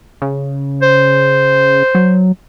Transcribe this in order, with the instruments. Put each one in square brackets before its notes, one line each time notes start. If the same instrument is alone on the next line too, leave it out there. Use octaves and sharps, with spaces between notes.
[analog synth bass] C#3
[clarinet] C5
[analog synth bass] F#3